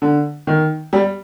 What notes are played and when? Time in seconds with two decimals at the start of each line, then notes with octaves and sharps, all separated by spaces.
0.02 D3
0.47 D#3
0.93 G3